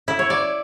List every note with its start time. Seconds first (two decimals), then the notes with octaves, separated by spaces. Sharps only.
0.08 E4
0.19 C#5
0.30 D5